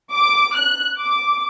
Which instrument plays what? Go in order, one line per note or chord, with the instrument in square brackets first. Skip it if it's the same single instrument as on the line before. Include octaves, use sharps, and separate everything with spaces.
[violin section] D6
F#6
D6